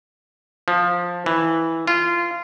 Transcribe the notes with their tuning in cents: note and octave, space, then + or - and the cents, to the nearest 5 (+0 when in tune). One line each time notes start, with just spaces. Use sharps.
F3 +10
E3 -10
F4 -20